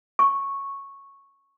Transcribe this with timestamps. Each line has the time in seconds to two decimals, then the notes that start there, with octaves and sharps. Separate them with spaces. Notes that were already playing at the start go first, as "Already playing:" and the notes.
0.19 C#6